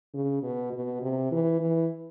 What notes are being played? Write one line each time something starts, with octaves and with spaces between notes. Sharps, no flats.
C#3
B2
B2
C3
E3
E3